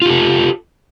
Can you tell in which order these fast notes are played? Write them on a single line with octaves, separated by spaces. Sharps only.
F4 G4 A4